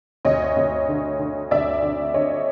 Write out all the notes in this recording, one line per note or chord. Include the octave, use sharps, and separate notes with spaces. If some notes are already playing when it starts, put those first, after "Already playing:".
D2 C#5 D#5
D2
D3
D3
D2 D5 E5
D3
D3 C#5 D#5